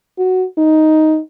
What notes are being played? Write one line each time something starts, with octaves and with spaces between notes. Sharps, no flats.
F#4
D#4